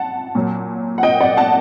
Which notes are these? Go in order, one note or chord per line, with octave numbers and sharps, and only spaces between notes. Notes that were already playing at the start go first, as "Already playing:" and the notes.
Already playing: F#5 A5
A#2 F#3
F#5
D#5 G5
D5 F#5
F#5 A5